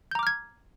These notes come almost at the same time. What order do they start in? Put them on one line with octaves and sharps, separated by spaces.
G6 A#5 D6 F6 G#6